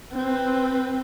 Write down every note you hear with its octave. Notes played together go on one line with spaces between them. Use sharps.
C4 B4